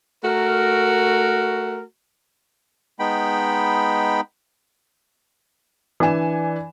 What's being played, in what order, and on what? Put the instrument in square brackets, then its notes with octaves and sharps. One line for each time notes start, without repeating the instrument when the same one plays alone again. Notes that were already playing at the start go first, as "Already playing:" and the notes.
[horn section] A3 F#4 A#4
[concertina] G#3 B3 D#4 G5 B5
[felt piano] E3 D4 G#5 E7